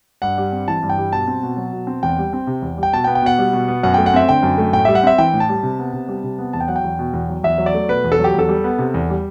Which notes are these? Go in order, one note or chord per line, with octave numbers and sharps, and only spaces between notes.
G2 F#5
G3
C4
E3 A5
G2
G5
G3
B2 A5
C4
B2
F#3
B2
C4
E2 G5
G3
C4
C3
E2
G3
G5
B2 A5
G5
B3
G5
B2 F#5
G3
B2
B3
F#2 F#5
A3 G5
F#5
C4 E5
D3 G5
F#2
A3
A2 G5
G3 E5
F#5
C4 E5
E3 G5
A2
A5
G3
C3
B3
C3
G3
C3
B3
E2 A5
G5
F#3 F#5
G5
E2
B2
E2
F#3
E2 E5
F#3
D5
A3
B2 B4
E2
A4
F#3 G4
E2 A4
G3
B3
C3
E2
G3